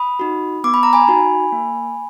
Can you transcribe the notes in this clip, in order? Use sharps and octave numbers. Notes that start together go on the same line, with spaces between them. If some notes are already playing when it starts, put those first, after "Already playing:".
Already playing: B5 D#6
D#4 F#4
B3 D6
B5
A#5
G#5 B5
D#4 F#4
A#3